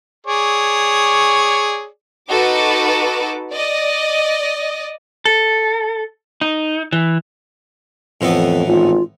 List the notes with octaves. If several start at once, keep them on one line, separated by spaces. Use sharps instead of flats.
G#4 C#5 D5
D#4 F#4 A4 B4 D6
D5 D#5
A4
D#4
E3
F2 A2 E3 B3
G#1 F4